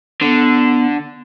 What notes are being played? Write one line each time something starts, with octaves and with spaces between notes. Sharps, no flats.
D3 B3